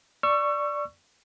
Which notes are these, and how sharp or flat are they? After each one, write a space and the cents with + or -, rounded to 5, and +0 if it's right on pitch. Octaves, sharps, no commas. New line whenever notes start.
D5 +0 C#6 +0 E6 +35